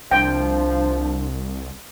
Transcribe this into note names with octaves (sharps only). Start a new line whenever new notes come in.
C2 F3 D4 G5